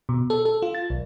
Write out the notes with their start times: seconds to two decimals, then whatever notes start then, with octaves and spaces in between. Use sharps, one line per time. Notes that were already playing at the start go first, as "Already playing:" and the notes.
0.09 B2
0.30 A4
0.45 A4
0.62 F4
0.75 A6
0.90 B1